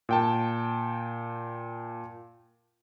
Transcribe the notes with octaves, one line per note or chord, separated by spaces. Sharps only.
A#2 G5 A5